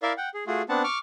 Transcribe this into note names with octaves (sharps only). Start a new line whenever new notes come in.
E4 A#4 D5 E5 F5
F#5 G5
G#4
A3 F4 F#4 G#4
B3 C4 D4 F#5 A5
C#6 D6 F6